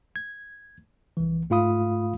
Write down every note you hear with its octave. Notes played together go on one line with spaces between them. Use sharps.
G#6
C2 E3
G#2 A3 F4 F5 B5 D#6